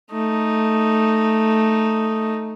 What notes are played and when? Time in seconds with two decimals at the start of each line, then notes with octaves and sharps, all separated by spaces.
0.12 A3 D#4